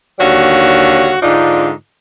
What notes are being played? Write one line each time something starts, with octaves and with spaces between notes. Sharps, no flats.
D#2 D3 G3 F#4 C#5 F5
G#2 D3 D4 D#4 F4